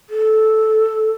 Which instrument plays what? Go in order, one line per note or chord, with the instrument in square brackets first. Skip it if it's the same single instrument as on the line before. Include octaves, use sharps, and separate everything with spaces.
[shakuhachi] A4